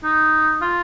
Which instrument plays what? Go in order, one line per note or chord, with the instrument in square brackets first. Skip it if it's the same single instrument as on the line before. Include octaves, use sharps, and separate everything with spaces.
[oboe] D#4
F4